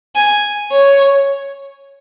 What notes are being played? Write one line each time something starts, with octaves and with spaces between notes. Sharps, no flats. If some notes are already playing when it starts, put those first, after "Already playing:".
G#5
C#5